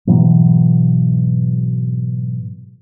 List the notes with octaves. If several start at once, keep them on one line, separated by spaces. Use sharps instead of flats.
G#2 B2 E3 F#3